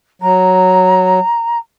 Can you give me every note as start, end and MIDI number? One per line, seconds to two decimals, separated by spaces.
0.22 1.20 54
0.22 1.58 82